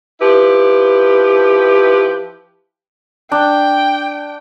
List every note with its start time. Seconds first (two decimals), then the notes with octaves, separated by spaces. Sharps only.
0.21 F3 E4 G4 B4
3.32 D4 G5